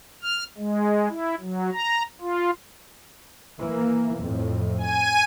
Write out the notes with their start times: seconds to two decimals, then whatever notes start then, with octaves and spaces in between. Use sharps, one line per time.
0.22 F6
0.58 G#3
1.09 E4
1.40 F#3
1.73 A#5
2.21 F4
3.62 E3 A#3
4.21 F2 A2
4.78 G#5 D#7